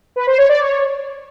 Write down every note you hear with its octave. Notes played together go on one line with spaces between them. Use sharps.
B4
C5
C#5
D5
C#5